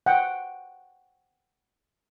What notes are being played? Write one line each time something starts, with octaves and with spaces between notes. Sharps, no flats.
F#5 G5